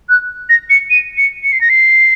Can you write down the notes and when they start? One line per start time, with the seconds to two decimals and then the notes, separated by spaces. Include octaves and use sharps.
0.09 F#6
0.49 A#6
0.70 C#7
0.90 D#7
1.17 C#7
1.44 C#7
1.53 C7
1.61 A#6
1.70 C7